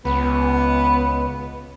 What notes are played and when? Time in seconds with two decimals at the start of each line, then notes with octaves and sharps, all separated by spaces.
0.05 C#2 B3